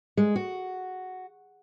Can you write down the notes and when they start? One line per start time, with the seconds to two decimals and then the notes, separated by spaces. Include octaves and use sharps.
0.17 G#3
0.36 F#4